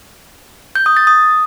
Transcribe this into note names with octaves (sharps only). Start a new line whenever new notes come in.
G6
D#6
A6
D#6